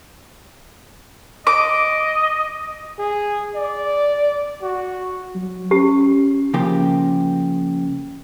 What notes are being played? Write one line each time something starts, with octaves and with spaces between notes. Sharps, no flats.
D#5 D6
G#4
D5
F#4
F#3
C#4 G4
C#3 F3 A#3 G4